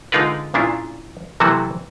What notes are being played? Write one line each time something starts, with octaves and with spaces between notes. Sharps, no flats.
D3 G#3 D#4 F4 A#4 B4
A#2 C#3 D4 E4 F4
C3 E3 F#3 A3 A#3 F#4